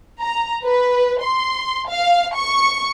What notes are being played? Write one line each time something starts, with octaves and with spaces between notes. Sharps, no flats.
A#5
B4
C6
F5
C#6